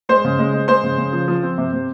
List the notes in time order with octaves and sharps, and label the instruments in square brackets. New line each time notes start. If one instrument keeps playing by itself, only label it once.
[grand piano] G#3 C5 C6
C#3
G#3
G#3
G#3 C5 C6
C#3
C#3
F3
F3
C4
C3
C3